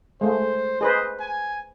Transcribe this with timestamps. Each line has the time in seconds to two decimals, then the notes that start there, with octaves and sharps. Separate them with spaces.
0.21 G#3 A3 C5
0.81 G#4 B4 C5 D#5
1.20 G#5